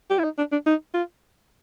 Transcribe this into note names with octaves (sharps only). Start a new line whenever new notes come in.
G4
E4
D#4
D4
D4
D#4
F4